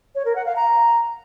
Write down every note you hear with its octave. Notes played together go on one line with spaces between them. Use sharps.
C#5
A#4
F#5
F5
A#5